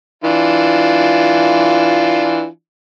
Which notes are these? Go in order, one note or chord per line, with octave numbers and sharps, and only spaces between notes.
E3 D4 F4